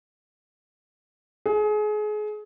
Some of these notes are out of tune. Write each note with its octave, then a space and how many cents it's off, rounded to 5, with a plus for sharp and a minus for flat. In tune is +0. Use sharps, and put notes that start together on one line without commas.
G#4 +30